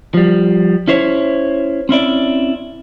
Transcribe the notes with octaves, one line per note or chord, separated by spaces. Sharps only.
F3 G3
C#4 E4 C5 C#5
C4 C#4 E4 D5